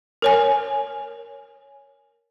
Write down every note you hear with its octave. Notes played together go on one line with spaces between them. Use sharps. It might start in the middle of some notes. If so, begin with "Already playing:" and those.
A#4 C#5 G#5